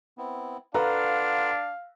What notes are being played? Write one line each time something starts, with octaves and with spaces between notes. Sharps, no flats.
B3 C4 E4
D4 F4 A4 B4 F5 F#5 A#5 F6